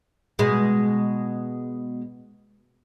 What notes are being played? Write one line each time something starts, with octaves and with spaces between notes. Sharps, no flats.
B2 G#3